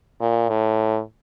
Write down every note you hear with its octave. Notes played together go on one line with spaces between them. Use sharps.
A#2
A2